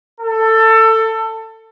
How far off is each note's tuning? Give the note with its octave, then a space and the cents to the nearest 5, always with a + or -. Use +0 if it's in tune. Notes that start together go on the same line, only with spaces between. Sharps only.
A4 +20